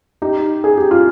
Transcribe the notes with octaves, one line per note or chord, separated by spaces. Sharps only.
D#4 G4
G#4
G4
F4